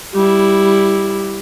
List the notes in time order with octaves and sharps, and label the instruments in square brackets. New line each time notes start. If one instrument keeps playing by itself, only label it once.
[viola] G3 E4